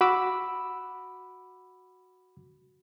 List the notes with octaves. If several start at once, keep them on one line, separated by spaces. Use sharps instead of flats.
F#4 B5 D6 E6